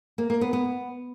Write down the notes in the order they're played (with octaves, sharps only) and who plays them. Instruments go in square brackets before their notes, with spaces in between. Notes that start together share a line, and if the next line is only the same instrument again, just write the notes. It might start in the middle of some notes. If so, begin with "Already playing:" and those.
[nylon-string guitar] A#3
A#3
B3
B3